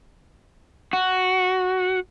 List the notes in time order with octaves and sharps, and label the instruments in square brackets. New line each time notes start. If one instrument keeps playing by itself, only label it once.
[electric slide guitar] F#4